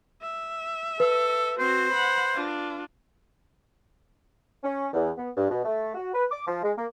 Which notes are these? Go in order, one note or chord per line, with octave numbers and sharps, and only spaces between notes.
E5
A4 B4
C4 F#4 C5
F#5 B5
D4 F4
C#4
E2
B3
G2
B2
A3
F#4
B4
D6
F3
G#3
A#3